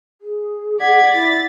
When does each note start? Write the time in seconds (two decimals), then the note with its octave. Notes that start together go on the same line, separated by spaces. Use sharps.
0.21 G#4
0.80 D5 F#5 G#6 B6
1.13 E4 A6